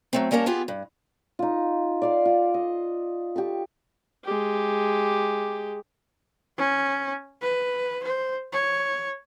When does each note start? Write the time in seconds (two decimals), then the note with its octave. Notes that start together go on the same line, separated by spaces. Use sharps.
0.13 F#3 A3 C4
0.31 G3 A#3 C#4 A#4 E5 A5
0.46 B3 F4 G4 G#4
0.68 G2
1.39 D#4 F4
2.02 D5 F5 C6
2.25 F4
2.54 D#5
3.36 G4 A5 C#6
4.24 G#3 G4
6.58 C#4
7.42 B4
8.03 C5
8.52 C#5